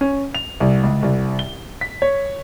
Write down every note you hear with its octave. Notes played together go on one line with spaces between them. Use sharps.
C#4
F7
C2
C#2
C2
G7
B6
C#5